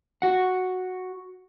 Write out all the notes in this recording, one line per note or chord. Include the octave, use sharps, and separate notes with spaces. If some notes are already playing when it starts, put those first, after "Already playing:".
F#4 F#5